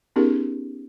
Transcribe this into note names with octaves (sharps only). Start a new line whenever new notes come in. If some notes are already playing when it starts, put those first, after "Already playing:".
B3 C#4 D#4 G4 G#4 A#4